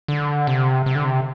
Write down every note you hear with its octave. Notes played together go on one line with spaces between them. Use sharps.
D3
C3
C3
D3
C3